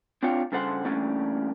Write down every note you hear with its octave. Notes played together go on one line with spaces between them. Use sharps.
C4 D4 F4 C#5 G5
G2 C#3 A4 C5 F#5 C6
E3 G3 A3 A#3 C#4 D4